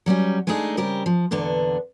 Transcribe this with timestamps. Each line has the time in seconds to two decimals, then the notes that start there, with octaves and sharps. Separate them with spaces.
0.06 F#3 G3 B3 C#4
0.47 G#3 A3 D4 D#4 G#4
0.77 C#3 G3 C4 G4 A#4
1.06 F3
1.31 E2 A#2 D3 B3 D4